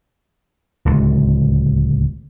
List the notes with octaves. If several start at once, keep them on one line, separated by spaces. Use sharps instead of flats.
D1 C#2